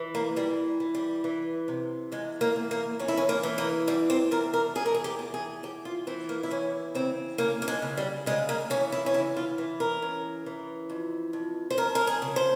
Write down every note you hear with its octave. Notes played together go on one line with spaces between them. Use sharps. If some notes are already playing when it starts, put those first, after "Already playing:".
Already playing: E3
A#3
E3 G3
E3
G3
E3
C3
E2 G#3
A#3
E2
A#3
E2 C#4
E4
C#4
A#3
E3
A#3
E2 G3
C4
E2 A#4
A#4
E2 G#4
A#4
G#4
G4
E2
G#4
E2 G4
F4
E3 C4
A#3
E4
E2 C#4
C#3 C4
C#3 A#3
A#3
G#3
C#3
G3
C#3 G#3
A#3
E3 C#4
E4
C#4
E2 E4
F4
E3
A#4
C#3
E3
F2
F2
C5
F2 A#4
A#4
G#4
C#3
C5